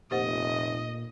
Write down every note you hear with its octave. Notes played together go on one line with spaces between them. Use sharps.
F1 A#2 G4 C5 D#5 F#5